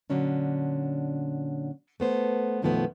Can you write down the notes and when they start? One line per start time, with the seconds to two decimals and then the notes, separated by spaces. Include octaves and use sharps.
0.10 A#2 D3 F#3 C#4 D4
2.00 A3 B3 C5
2.62 F#2 B2 D#3 F3 A3 B3